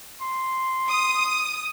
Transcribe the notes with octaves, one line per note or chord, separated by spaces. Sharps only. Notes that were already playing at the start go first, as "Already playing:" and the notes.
C6
D#6